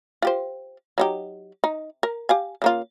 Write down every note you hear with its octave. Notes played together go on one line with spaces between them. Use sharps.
F4 G4 C5
F#3 D#4 G4
D#4
A#4
G4 F5 G#5
C#3 A#3 F4